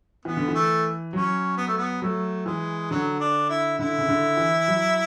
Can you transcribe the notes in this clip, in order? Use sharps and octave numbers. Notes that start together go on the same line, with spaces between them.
E3 B3
D3
E3
A3
F#3 C#4
B3
A3
B3
F#3 A3
E3 G#3
D3 F#3
D4
E4
D3 E4
C#3
D3
E3
F#3